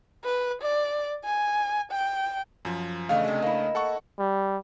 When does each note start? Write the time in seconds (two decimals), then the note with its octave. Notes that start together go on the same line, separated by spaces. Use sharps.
0.24 B4
0.62 D5
1.25 G#5
1.92 G5
2.65 F#2 F3
3.09 E2 C#3 A3 D4 D#5 F5
3.24 C3 G#3
3.42 A#3 E4
3.75 A4 F#5 C#6
4.19 G3